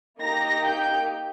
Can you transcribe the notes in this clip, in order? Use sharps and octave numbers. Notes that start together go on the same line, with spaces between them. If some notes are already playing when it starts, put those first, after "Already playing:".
A#3 D#4 G4 A#5 A#6
G5 G6